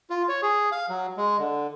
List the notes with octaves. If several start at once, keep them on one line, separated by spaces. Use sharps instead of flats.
F4
C#5
G#4
F5
F#3
G#3
D3